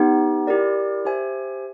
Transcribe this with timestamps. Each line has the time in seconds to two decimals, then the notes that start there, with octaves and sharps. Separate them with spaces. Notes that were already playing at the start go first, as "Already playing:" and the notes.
Already playing: B3 D#4 G4
0.47 E4 G4 A#4 D5
1.05 G4 C5 E5 G#5